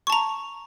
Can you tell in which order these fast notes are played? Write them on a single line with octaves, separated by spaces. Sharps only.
C#6 A5 A#5